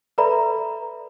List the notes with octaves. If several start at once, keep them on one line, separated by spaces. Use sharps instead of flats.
A4 B4 D5 E5 A#5 B5